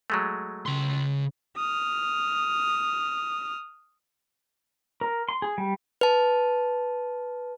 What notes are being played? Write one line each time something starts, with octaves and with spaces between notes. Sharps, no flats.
F#3 G#3 A3
C#3 C6
D#6 F6
A#4
C6
G#4
G3
B4 A5